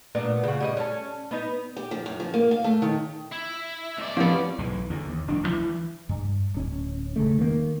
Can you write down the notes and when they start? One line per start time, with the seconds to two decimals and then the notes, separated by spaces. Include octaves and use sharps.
0.15 A#2 B3 D4
0.43 C#3 F#4
0.60 G3 G#4 D#5
0.77 C#4 A4
1.31 B3 D#4
1.77 G4
1.91 F3
2.06 F#2
2.20 F3
2.34 A#3
2.51 F5
2.64 A3
2.82 D#3
3.32 E4
3.97 C#2 D5
4.17 F3 B3 C4 E4 G4
4.58 B1 G#2 E3
4.90 E2 D3
5.10 D#2
5.27 F1 D4
5.43 A1 D2 E3
6.09 G2
6.54 D1 C#4
7.16 E1 C#3 A3
7.39 D#3 A#3